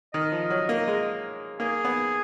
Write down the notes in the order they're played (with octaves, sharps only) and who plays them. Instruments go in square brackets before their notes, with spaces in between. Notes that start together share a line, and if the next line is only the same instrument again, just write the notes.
[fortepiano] D#3 [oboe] D#5
[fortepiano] F3
F#3
A#3
G#3
[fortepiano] A#3 [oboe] G#4
[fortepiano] B3